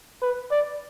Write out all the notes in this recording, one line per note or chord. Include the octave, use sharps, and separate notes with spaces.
B4
D5